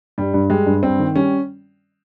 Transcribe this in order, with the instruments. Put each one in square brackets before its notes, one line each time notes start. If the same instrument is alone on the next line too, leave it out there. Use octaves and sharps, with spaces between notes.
[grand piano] G2 [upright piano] G3
[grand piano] G2
[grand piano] G3 [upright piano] G#3
[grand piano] G2
[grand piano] G2 [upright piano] C4
[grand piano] D#3
[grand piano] G3 [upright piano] C#4